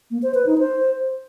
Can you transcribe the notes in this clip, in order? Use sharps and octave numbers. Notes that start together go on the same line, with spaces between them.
A#3
C5
B4
D#4
C5